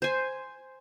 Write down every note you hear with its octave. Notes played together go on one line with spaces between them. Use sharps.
C5 G#5